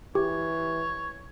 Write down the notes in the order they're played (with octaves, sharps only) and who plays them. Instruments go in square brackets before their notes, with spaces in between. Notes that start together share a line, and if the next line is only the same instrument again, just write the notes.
[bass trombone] E3 [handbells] G4 [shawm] C#5